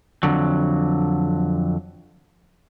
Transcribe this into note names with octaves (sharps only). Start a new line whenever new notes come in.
F2 B2 D3 F#3